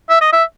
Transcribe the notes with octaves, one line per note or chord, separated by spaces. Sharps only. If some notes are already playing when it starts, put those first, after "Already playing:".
E5
D#5
E5